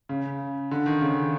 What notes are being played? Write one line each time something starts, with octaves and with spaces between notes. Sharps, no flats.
C#3
D3
D#3
C#3